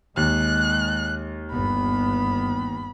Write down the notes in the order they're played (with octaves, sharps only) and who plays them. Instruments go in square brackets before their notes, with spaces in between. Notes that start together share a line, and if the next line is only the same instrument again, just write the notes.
[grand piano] D#2 [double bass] G#3 [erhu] F#6
[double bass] G1 B3 [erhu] B5